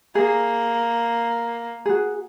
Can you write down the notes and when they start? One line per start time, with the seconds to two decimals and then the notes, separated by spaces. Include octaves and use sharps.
0.15 A#3 G#4
1.86 F#4 G#4